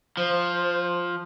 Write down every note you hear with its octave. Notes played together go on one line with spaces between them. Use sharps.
F3 C5